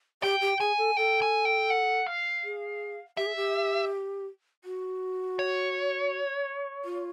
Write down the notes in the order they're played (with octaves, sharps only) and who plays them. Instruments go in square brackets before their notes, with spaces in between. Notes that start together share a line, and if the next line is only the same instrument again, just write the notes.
[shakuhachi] G4 [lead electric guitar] G5
[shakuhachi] G4
[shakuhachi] G#4 [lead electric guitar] G#5
[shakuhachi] A4
[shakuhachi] A4 [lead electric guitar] G5
[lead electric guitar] G#5
G5
F#5
F5
[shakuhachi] G#4
[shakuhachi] G4 [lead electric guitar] E5
[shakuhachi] G#4
G4
F#4
[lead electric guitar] C#5
[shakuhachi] F4